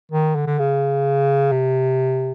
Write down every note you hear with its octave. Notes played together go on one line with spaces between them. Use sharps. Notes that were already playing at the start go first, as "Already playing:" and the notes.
D#3
D3
D3
C#3
C3